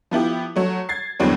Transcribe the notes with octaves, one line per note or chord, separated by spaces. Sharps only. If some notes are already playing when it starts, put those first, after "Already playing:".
F3 B3 E4 G4
F#3 A3
G#6 A6 C7
E2 A2 D3 F#3 G3 C4